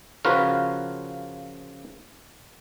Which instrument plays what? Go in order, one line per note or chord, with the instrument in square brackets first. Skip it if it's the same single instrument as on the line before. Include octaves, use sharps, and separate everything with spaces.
[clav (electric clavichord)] C#3 F3 F4 F#4 A#4 B4